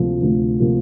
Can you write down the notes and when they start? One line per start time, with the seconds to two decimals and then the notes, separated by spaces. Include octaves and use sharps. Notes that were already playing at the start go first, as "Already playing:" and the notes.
Already playing: D2 C3 F3 A#3
0.22 D2
0.60 C3 F3 A#3